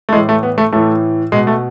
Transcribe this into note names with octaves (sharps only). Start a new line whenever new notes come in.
A3
A2 E3 G#3
A3
B3
A3
A2 E3 A3
B2 G#3
A3